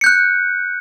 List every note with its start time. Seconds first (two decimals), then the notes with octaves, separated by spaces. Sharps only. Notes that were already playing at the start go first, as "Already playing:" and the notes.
0.01 C#7
0.04 G6
0.06 F#6